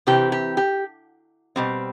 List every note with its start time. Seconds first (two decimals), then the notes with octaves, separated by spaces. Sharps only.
0.07 C3 E3 C4 G4
0.32 G4
0.57 G4
1.56 B2 G3 C4